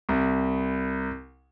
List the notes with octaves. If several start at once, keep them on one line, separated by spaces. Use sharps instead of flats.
C2